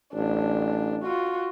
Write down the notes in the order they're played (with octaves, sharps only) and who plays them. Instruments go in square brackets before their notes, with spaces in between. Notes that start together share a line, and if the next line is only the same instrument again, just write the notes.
[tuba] A1 [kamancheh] D4
[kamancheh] F4 F#4